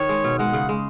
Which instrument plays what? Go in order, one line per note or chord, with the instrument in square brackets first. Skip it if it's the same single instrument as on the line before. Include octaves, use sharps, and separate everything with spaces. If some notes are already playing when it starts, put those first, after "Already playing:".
Already playing: [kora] D#3 [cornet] C#5
[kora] G#3
B2
[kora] G#3 [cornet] F#5
[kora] C#3
G#3